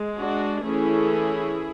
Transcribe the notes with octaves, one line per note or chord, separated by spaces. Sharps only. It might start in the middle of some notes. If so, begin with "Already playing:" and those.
Already playing: G#3
D4 F#4
E3 A3 C#4 E4 G#4